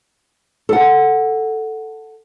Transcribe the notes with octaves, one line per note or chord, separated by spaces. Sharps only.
A4 F#5